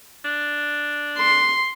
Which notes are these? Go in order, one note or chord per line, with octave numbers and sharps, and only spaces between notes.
D4
C6